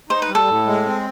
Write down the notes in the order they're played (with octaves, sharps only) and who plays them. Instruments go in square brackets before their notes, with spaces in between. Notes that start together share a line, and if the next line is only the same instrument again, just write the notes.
[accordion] D#4 [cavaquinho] C5
[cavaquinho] B4
[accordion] G3
[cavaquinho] A4
[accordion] A2
G#3
C4